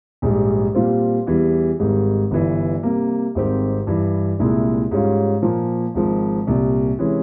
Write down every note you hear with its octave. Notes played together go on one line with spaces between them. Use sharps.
A#1 G#2 G3
A#2 G3 C4 F4
E2 E3 G3
G#1 G#2 G3
G1 G2 E3
C3 G3 A#3
G#1 G#2 G3 C4 G4
G2 E3 G3
C2 A#2 G#3 E4
G#2 G3 C#4 F4
A#2 F3 A#3
G#1 G#2 F3
C2 A#2 G3
C3 E3 G#3 C#4